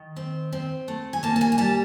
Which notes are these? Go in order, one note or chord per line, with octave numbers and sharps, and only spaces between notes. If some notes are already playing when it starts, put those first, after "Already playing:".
Already playing: D#3
C4
C4
A3
G#5
A#3 A5
A5
G#5
G#5
G3 A5